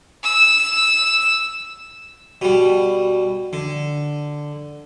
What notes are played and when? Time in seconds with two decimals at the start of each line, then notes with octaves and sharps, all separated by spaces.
0.24 E6
2.41 B2 G3
3.53 D3